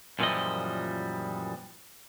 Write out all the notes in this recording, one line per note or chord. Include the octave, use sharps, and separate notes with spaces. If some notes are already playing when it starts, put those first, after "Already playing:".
F#2 A#2 E3 F3 G3 D#5